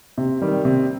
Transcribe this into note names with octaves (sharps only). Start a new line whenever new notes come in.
C3
D#3 G3
C3